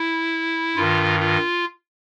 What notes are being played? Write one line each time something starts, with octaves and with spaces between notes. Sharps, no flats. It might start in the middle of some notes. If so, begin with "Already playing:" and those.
Already playing: E4
G2 D#3 F4
F4